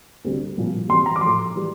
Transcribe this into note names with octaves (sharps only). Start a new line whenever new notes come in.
D2 C3 G3
C2 A#2 F3
E2 C3 G3 C6
A#5
D6
A2 F3 C6
E3 G3